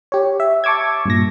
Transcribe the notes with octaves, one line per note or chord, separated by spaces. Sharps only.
G4 C#5
E5
A5 C#6 D6 E6 G#6
G2 A#2 A#6